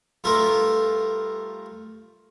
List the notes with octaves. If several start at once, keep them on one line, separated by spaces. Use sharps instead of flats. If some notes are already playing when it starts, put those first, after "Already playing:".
G2 A3 F4 A#4 E5